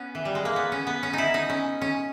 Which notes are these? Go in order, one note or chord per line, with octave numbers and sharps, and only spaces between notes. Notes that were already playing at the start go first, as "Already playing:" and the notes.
Already playing: B3 C#4
E3
G3
G#3
A#3
B3
C#4
B3
C#4
D#4 E4
D#4
C#4
C#4